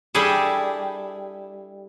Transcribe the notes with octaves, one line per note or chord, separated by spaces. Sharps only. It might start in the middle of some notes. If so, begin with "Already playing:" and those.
G3 D4 E4 G#4 A4